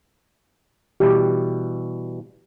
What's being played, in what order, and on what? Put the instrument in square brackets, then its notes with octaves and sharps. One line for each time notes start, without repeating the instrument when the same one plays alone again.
[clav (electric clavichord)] B2 E3 G3 [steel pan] G4